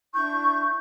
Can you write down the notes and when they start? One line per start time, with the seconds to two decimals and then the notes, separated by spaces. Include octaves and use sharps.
0.14 D4 E4 C#6 G6